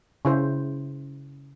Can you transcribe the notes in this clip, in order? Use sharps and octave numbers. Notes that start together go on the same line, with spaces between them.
C#3 E4 C5